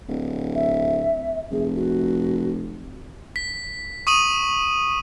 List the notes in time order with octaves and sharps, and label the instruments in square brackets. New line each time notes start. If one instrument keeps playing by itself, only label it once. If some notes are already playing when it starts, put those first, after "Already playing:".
[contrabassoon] D1
[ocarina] E5
[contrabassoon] F1 [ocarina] G#4
[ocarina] F#4
[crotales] B6
C#6 D#6 D#7 F#7